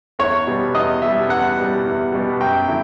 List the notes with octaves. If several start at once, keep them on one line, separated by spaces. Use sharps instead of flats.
E2 C#5
B2 G3
E2 D#5
B2 G3 E5
E2 F#5
B2 G3
E2
B2 G3
F#2 G5
D3 F#3 E4